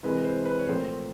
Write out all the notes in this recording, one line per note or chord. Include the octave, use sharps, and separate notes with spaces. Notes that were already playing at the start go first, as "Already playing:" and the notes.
C2 C3 E3 G#3 B4
C5
B4
C#5
C2 A#2 F3 A3 C4 C5